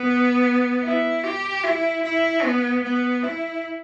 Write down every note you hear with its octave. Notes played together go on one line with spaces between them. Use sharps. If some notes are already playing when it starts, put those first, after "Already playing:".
Already playing: B3
E4
G4
E4
E4
B3
B3
E4